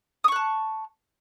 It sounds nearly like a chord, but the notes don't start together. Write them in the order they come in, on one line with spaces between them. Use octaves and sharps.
D#6 C#6 F#6 A5